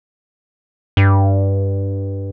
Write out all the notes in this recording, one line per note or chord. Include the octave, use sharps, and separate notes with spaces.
G2